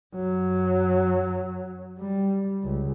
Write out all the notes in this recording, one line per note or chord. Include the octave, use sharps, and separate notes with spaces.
F#2 F#3
G3
C#2